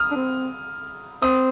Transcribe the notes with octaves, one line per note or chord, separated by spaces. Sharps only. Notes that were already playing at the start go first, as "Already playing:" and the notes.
Already playing: D#6 F6
D4
C4
C4 D#6